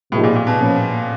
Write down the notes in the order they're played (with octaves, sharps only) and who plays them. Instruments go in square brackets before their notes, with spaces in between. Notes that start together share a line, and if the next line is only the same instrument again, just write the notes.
[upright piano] A2 [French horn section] C3 F3 A#3 D#4 G#4
[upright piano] A#2
A#2
B2
[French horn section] F3 A#3 C#4 F4 A4